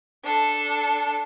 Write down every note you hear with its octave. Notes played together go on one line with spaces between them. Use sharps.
D4 A4